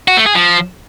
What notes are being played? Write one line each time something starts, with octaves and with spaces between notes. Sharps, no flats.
F#4
A3
G#4
F3